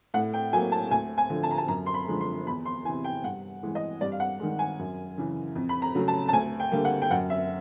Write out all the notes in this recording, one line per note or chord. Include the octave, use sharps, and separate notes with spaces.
A2 F#5
G5
F#3 A#3 G#5
A5
D2 G#5
G#5
D3 F3
A5
A#5
A5
F#2 A#5
C6
B5
D3 F3 G#3
C6
E2 B5
C6
C3 E3 G#5
G5
G2 F#5
E3 G#3
D#5
G2 D5
F5
F#5
D#3 G#3
G#5
F#2
C#3 E3
F2
B5
A#5
C#3 F#3 A3
A5
A5
D2 G#5
G5
D3 G3 A#3
F#5
G5
F#2 F#5
E5